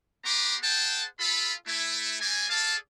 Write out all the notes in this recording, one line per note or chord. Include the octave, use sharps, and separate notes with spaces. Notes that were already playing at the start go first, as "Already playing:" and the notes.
B3 G4 B4 A#5 C6 D6
G#4 C5 F#5 G5 A5
F4 A4 B5
A3 E4
G3 C4 D5 G#5
G#4 A4 D5 F5 A5